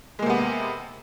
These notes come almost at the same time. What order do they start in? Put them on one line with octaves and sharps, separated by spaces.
G#3 A#3 C3 B3